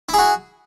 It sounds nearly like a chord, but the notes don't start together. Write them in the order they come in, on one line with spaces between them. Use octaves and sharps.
E4 G#4 F#4